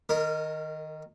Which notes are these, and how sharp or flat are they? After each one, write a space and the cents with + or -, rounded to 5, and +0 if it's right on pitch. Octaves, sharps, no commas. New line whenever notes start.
D#3 +0 A#4 -30